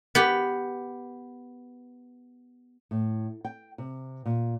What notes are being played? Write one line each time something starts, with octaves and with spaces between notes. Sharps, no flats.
B3 G4
A2
G5
C3
A#2